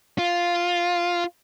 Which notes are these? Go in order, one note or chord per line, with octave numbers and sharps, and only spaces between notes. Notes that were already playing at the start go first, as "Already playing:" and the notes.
F4